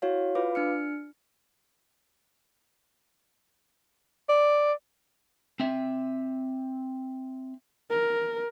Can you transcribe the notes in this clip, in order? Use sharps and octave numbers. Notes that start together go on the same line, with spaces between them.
E4 F#4 C#5 F5
F4 B4 F5 D6
D4 F6 C#7
D5
C4 E5
A#4